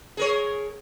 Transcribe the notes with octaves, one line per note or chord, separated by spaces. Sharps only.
G#4 A#4 C#5